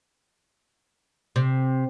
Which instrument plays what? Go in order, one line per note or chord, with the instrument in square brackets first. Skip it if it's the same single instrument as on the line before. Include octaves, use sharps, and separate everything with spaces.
[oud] C3